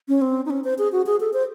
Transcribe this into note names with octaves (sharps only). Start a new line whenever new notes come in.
C#4
C4
D#4
C#4
C5
G#4
F#4
G#4
A4
C5